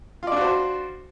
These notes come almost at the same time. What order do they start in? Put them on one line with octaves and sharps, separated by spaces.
F4 D5 D4 F#4 C5